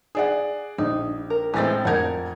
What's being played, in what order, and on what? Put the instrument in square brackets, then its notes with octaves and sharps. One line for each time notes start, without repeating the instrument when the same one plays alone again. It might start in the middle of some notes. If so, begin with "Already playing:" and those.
[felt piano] G#4 D5 F#5
[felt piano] A#1 [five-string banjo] D#4
[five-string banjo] A#4
[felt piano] A2 A6 [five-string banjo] E3 G#3 C4
[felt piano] F2 G#6 [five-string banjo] A#4 F#5